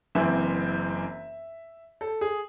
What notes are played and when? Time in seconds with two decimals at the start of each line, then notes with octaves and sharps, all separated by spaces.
0.15 F#1 F#2 E3 C4 E5
2.01 A4
2.21 G#4